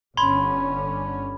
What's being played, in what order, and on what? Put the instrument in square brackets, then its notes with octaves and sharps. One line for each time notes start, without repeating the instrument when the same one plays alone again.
[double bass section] G1 D3 C#4 [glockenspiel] B5 G#6 [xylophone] C6